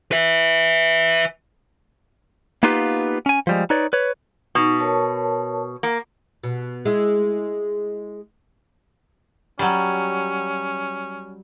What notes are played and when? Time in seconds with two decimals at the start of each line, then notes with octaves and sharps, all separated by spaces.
0.11 B4 E5
2.63 A#3 B3 D#4 F4 G4 B4
3.26 C#4 G#5
3.47 F3 G3 G#3
3.70 D#4 B4 C#5 D5
3.93 B4 C#5
4.55 B2 D#4
4.79 A#4 C#5 A5
5.83 A#3
6.44 B2
6.85 G#3 E4 G#4
9.59 F#3 G3 C#4